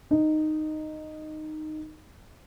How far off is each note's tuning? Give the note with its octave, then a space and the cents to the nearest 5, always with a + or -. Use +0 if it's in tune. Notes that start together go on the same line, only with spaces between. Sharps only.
D#4 -10